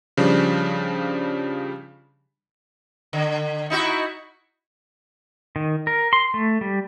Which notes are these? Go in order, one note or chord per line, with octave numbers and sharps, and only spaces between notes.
C#3 F3 G3 D4
D3
D#4 E4 F#4
D#3
A#4
C6
A3
G3